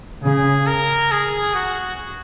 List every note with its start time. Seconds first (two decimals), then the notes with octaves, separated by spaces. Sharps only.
0.24 C#3 G#4
0.67 A#4
1.11 G#4
1.55 F#4